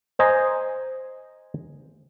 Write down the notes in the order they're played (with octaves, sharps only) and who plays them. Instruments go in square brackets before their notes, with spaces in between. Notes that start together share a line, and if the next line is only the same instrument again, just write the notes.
[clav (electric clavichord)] C5 D#5 G#5 A#5